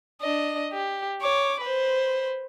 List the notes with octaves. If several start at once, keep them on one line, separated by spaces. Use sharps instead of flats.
D4 D#5
G4
C#5 D6
B4 C5